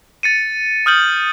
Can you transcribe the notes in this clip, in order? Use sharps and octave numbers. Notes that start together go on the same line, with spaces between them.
A6 C#7 D#7
D#6 F6 G6 F#7